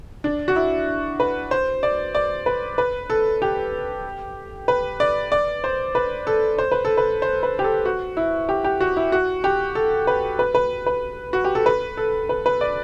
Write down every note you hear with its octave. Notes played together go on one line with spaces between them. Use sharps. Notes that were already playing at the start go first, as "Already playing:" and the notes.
D4
F#4
E4
B4
C5
D5
D5
B4
B4
A4
G4
B4
D5
D5
C5
B4
A4
C5
B4
A4
B4
C5
B4
G4
A4
F#4
E4
G4
G4
F#4
E4
F#4
G4
A4
B4
B4
B4
B4
F#4
G4
A4
B4
A4
B4
B4
D5